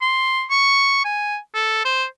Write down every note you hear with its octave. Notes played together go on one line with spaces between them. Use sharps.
C6
C#6
G#5
A4
C5